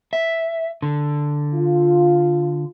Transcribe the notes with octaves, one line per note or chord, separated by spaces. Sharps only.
E5
D3
F4